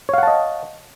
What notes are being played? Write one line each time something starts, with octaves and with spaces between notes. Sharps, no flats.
C#5 D#5 F5 F#5 A5